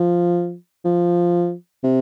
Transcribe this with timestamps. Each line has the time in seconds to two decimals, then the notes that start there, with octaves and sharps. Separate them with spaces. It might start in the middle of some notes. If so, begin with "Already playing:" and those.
Already playing: F3
0.84 F3
1.84 C3